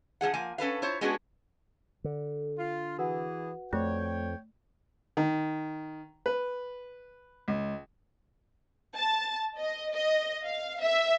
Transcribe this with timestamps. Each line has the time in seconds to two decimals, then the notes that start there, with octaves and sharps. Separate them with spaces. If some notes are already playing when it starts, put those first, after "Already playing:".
0.21 F3 A3 G#4 F#5
0.34 F3 A#3 G#5
0.58 C#4 A4 B4 F5
0.82 E4 F4 C5 C#5
1.01 G#3 B3 C#4 D4 F#4 G#4
2.04 D3
2.58 F4
2.98 E3 F#4 G#4 B4 F#5
3.73 F2 A3 C#5 G5
5.17 D#3
6.26 B4
7.48 C#2
8.97 A5
9.57 D#5
9.92 D#5
10.45 F5
10.81 E5